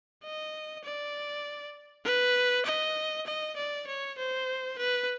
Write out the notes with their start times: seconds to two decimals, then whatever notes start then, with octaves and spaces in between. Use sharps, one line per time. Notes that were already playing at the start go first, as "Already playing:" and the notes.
0.23 D#5
0.84 D5
2.05 B4
2.66 D#5
3.26 D#5
3.57 D5
3.87 C#5
4.18 C5
4.78 B4